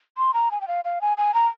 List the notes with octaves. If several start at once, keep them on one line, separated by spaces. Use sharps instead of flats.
C6
A#5
G#5
G5
F5
F5
G#5
G#5
A#5